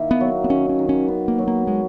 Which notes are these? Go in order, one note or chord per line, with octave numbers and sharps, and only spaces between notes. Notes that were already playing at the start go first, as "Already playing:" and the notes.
Already playing: D#3 A#3 E4
B3
F#3
B3
D#3 C#4
C#4
D#3
C#4
B3
A#3
F#3
A#3
G#3